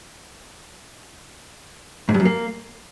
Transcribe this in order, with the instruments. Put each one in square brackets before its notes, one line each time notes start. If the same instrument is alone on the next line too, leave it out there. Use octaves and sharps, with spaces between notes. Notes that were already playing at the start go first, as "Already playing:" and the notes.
[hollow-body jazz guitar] G#2
G2
F#2
A#3